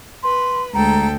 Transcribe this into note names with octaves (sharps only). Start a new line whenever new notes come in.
B4 C6
D2 G#3 A4 G5 A#5